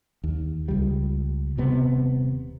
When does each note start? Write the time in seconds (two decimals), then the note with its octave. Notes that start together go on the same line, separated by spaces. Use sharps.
0.24 D#2
0.68 C#2 G3
1.57 D#1 C3 B3